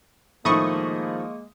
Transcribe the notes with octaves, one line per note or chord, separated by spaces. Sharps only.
A2 D#3 F3 G#3 A#3 D#4 C#6 D#6